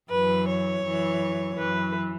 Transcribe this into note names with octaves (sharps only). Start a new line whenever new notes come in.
F#2 E3 B4
C#5
F#2 E3
F#2 E3 B4